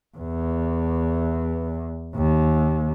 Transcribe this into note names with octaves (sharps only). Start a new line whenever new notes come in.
E2
D#2